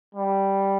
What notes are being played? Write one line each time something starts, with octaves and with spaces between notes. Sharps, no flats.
G3